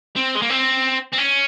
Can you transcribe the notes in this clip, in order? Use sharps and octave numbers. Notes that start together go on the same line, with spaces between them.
C4
G#3
A#3
C4
C4
C#4